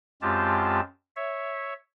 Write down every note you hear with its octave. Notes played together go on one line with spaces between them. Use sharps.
F#2 G#3 C4 F4 G4 A5
C#5 E5